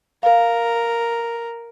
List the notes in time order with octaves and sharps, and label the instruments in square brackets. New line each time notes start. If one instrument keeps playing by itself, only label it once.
[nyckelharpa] A#4 [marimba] F5